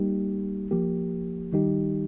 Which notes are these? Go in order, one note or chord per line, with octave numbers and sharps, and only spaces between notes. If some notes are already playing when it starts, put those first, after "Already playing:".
Already playing: G3 A#3 D#4 G4
F3 A#3 G4
D#3 G3 D#4 G4